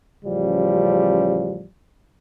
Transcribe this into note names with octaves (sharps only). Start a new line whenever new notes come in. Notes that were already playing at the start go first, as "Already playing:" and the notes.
A1 C#3 F3 G3